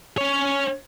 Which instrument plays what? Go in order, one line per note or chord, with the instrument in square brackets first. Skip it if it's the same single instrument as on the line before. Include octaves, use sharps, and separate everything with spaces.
[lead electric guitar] C#4 C#5